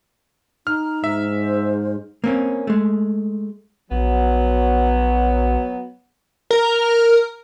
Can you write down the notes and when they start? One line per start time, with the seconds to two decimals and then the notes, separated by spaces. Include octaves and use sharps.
0.67 D#4 F6
1.04 G#2 E5
1.40 C5
2.24 A#3 C4 C#4
2.67 G#3 A3
3.91 A#1 F#3 B3
6.51 A#4